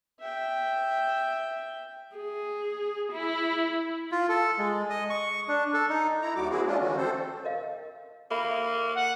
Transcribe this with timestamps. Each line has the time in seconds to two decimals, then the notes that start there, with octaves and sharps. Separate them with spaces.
0.20 E5 G5
2.16 G#4
3.12 E4
4.12 F4
4.29 A4
4.58 G#3
4.90 D#5
5.10 C#6
5.48 D4
5.74 A4
5.90 D#4
6.22 E4 A#5
6.36 D#2 G3 F#4 D6
6.50 A#3 C4 E4 F#4 G#4
6.67 G#3 C#4 D4 F4
6.80 D3 E3 G3 A3 C#4 F#4
6.97 C4 A4 C5
7.45 A#4 D#5 F5
8.31 A#3 A4 E5 B5
8.95 F#5